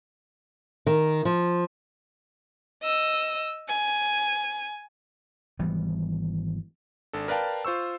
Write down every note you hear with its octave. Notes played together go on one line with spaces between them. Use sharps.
D#3
F3
D#5 E6
G#5
G#1 E3 G3 B3
G#1 D4 A4
A#4 B4 D5 F5 G5 A5
F4 C5 C#6 E6